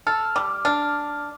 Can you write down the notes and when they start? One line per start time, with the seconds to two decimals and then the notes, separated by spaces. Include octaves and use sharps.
0.07 A4 F6
0.36 G3 D6
0.65 D4 F6